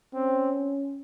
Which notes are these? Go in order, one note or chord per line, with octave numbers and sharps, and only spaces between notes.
C4 C#4